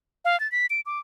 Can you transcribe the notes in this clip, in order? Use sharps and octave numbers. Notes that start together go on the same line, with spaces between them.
F5
A6
B6
D7
D6